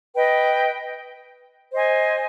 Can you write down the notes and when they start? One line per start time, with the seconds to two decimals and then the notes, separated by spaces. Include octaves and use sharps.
0.15 B4 D#5 G5
1.72 C5 D#5 G#5